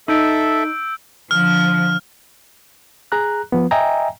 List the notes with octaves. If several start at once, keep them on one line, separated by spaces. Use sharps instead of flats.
D#4 A4 E5 E6 G6 D7
D3 F3 F6
G#4 A#5 F#6
F3 B3
D#5 E5 G5 G#5 A#5